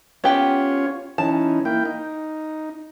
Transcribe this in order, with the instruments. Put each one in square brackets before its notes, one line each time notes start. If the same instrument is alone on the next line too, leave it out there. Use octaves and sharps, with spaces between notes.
[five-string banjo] B3 G4 G5 [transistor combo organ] C#4 F4 C#5
[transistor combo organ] E3 C#4 D#4 [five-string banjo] A5
[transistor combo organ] A#3 E4 G5
D#4